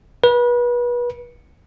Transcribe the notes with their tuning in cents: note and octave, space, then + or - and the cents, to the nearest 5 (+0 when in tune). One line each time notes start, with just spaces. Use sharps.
B4 -30